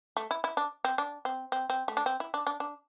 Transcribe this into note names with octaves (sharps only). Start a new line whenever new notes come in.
A3
E4
E4
D4
C4
D4
C4
C4
C4
A3
D4
C4
E4
D4
D4
D4